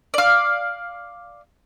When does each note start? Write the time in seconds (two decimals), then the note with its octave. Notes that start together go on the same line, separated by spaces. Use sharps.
0.14 D5 F5